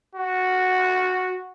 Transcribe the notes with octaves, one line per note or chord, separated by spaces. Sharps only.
F#4